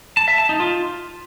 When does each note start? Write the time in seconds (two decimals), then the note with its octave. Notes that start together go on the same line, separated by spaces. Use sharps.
0.17 A5
0.28 E5
0.38 A5
0.49 D#4
0.60 F4